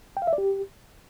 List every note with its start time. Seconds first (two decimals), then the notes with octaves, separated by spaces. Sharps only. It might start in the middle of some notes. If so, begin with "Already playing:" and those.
0.17 G5
0.22 F5
0.27 E5
0.33 D5
0.38 G4